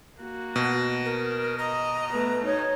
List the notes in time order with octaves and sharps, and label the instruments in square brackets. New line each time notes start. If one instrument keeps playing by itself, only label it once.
[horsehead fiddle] A#3 F#4
[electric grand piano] B2
[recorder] A#4
[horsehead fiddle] D#5 [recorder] A#5
[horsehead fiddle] A3 B3 [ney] B4
[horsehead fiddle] D#4 [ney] C#5